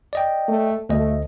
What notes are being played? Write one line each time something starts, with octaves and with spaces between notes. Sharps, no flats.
D5 D#5 G5
A3
D2 A3 D#5